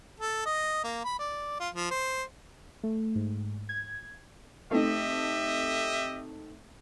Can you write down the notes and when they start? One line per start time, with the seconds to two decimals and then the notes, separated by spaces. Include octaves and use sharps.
0.20 A4
0.46 D#5
0.84 A#3
1.05 B5
1.19 D5
1.60 F4
1.74 F3
1.91 C5
2.83 A3
3.15 G#2
3.69 G#6
4.71 A3 C4 D#4 G4 D#5 E5